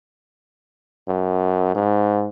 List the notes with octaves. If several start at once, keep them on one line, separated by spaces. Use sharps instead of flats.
F#2
G#2